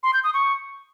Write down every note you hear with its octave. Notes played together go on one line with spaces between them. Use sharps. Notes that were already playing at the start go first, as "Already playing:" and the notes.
C6
G6
D#6
C#6